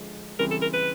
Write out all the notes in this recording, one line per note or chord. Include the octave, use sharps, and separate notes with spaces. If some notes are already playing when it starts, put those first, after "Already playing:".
Already playing: D3 F3 G#3
C#3 E3 G3 C4 A#4
A4
A#4
B4